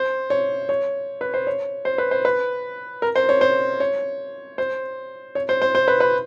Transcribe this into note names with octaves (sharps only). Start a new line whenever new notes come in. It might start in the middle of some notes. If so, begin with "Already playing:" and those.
Already playing: C5
C#5
C#5
B4
C5
C#5
C5
B4
C5
B4
A#4
C5
C#5
C5
C#5
C5
C#5
C5
C5
C5
B4
B4